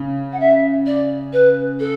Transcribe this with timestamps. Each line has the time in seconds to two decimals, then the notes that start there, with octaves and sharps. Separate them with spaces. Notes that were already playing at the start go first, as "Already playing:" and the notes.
Already playing: C#3
0.32 F#5
0.39 E5
0.86 D5
1.32 B4
1.79 A4